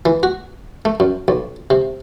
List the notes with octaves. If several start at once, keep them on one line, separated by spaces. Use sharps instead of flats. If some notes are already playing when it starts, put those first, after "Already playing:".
E3
F#4
A3
F#2
B1
C3